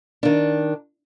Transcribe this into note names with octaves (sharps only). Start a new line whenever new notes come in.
D#3 D4